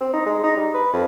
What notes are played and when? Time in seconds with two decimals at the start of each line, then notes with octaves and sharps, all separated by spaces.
0.01 C4
0.13 D#4
0.26 G#3
0.44 D#4
0.57 G3
0.74 B4
0.94 F2